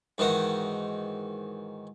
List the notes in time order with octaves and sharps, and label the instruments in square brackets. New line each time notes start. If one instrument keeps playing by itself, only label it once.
[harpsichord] G#2 D#3 E3 F#4